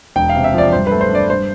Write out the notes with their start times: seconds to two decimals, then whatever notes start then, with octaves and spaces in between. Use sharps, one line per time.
0.16 E1 G5
0.29 F5
0.35 C3
0.44 E5
0.54 F3 D5
0.72 G2 C5
0.87 A3 B4
1.01 C5
1.10 D4 D5
1.29 G2 C5